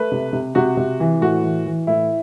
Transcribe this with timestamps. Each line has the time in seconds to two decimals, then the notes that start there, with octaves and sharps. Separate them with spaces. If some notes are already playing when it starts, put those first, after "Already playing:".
Already playing: A3 B4
0.12 C3
0.33 C3
0.55 C3 F#4
0.77 C3
1.00 E3
1.21 A2 F#4
1.44 E3
1.66 E3
1.87 A2 E4